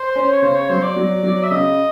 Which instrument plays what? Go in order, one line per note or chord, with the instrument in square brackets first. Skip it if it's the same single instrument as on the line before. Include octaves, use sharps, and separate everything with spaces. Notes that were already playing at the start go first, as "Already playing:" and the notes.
Already playing: [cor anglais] C5
[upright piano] C#4
[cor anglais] C#5
[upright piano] C#3 [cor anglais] C5
[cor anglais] C#5
[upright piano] F#3 [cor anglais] C5
[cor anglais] D5
[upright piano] F#3
F#3
[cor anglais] E5
[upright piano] C#3 [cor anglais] D#5